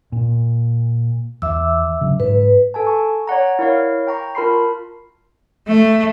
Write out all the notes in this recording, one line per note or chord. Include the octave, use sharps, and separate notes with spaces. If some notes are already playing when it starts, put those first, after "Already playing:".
A#2
E2 E5 D6 E6
C#3 F#3
G#2 B4
A4 G#5 A5
C#6
C#5 D5 F#5 A#5
E4 A#4 C#5 F5
G5 A#5 C#6
F4 A#4 A5 B5 C6 C7
A3